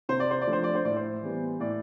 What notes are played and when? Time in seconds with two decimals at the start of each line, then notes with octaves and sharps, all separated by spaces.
0.09 C3 C5
0.20 D5
0.31 C5
0.41 D5
0.47 F3 A3 D4
0.53 C5
0.64 D5
0.75 C5
0.85 A2 D5
0.96 C5
1.22 E3 G3 B3
1.60 A2 D5